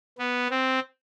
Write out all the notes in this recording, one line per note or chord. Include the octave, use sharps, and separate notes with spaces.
B3
C4